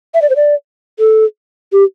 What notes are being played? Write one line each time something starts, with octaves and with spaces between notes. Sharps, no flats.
E5
D5
C5
D5
A4
G4